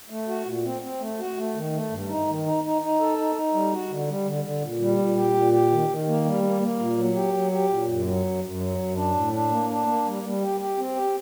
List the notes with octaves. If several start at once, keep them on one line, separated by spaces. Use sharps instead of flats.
A3
F#4
A#2
C4
C4
A3
F#4
A3
D#3
A3
G2
D#4
D#3
D#4
D#4
D#4
A4
D#4
D#4
G3
F#4
D3
G3
D3
D3
A#2
G3
A#2
G4
A#2
G4
D#3
D#3
A#3
G3
A#3
A#3
A#2
F#3
G4
F#3
G4
A#2
F#2
F#3
F#2
F#2
F#3
F#2
D4
A2
D4
A#3
D4
A#3
G3
G3
G4
G4
C4
G4